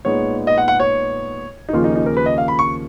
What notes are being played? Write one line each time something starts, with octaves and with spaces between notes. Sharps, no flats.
A#2 G#3 B3 D#4 C#5
D#5
F#5
F#5
C#5
D#4
D#2 C#3 F3 A#3 C#4 F4
D#4
D#4
A#4
B4
D#5
F5
B5
C#6